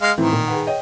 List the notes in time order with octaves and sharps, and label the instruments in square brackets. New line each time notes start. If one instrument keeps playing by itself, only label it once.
[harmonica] G#3 F5
[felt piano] A2 E3 C4 [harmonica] D#3
[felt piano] A#2
G#4 B4 F#5
C#5 D#5 G5